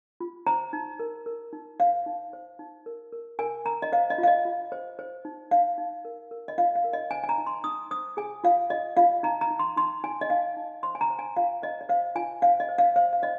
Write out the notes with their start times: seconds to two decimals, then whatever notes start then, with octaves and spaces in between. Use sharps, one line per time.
0.20 F4
0.46 C5 A#5
0.73 D#4
0.99 A#4
1.26 A#4
1.53 D#4
1.80 C5 F5
2.06 D#4
2.33 C5
2.59 D#4
2.86 A#4
3.13 A#4
3.39 A#4 G#5
3.65 A#4 A#5
3.82 D#5
3.92 C5 F5
4.10 D#5
4.18 F4
4.23 F5
4.27 D#5
4.45 F4
4.72 C5
4.99 C5
5.25 D#4
5.51 D#4 F5
5.78 D#4
6.05 A#4
6.31 A#4
6.48 D#5
6.58 F4 F5
6.75 F5
6.84 A#4
6.93 D#5
7.11 C5 G#5
7.24 G#5
7.29 A#5
7.38 D#4
7.47 C6
7.64 D#4 D#6
7.91 C5 D#6
8.17 G#4 G#5
8.44 F4 F5
8.70 F4 D#5
8.97 F4 F5
9.23 D#4 A#5
9.41 A#5
9.51 D#4
9.59 C6
9.76 D#4 C6
10.04 D#4 G#5
10.21 D#5
10.30 D#4 F5
10.57 D#4
10.83 C5 C6
10.95 G#5
11.01 A#5
11.10 C5
11.19 G#5
11.36 F4 F5
11.62 C5 D#5
11.81 D#5
11.89 C5 F5
12.15 F4 G#5
12.42 C5 F5
12.60 D#5
12.69 C5
12.78 F5
12.96 C5 F5
13.13 F5
13.22 C5 D#5